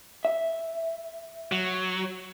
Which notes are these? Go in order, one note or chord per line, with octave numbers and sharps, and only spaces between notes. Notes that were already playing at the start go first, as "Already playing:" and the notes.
E5
F#3